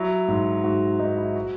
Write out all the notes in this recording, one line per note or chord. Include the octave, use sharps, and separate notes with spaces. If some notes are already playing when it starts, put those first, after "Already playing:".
Already playing: F#3 E4
G#2
G#2 F#4
G#2 D#4
E4
F#4